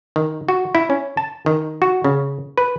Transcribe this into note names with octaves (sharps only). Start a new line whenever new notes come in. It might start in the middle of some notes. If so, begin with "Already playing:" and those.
D#3
F#4
E4
C#4
A5
D#3
F#4
C#3
B4